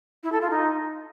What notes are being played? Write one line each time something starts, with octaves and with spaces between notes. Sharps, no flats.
E4
A4
F4
D#4